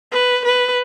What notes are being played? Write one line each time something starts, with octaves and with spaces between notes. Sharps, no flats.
B4
B4